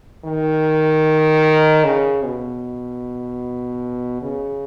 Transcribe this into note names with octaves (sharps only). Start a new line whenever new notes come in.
D#3
C#3
B2
C#3